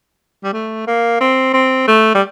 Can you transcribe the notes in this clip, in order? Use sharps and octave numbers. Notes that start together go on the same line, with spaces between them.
G3
A3
A#3
C4
C4
A3
G3